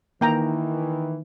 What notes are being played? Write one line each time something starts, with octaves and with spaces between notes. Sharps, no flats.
D#3 E3 A#3 G5 A#5